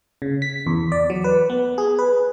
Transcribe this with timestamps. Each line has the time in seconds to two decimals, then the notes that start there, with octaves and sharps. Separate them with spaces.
0.22 C#3
0.42 B6
0.66 E2
0.92 D5
1.10 F#3
1.24 B4
1.50 B3
1.78 G#4
1.99 B4